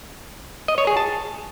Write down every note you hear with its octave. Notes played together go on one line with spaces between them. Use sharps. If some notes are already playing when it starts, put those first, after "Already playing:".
D#5
C#5
G#4
A5